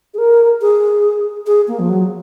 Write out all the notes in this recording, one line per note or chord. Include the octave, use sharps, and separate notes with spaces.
G#4
A#4
G#4
G#4
A#3
F3
F#3